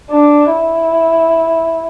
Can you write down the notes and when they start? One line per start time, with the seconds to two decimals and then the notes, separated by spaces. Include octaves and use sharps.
0.11 D4
0.53 E4